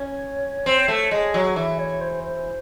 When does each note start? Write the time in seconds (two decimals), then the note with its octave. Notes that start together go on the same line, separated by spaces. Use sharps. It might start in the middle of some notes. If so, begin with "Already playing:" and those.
Already playing: C#4 C#5
0.66 C4
0.88 A3
1.11 G#3
1.34 F#3
1.56 E3 E5
1.79 C#5
2.01 C5
2.24 C5